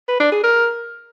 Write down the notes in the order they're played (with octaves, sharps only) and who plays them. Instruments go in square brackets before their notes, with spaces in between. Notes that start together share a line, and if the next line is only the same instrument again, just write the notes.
[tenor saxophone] B4
D4
G#4
A#4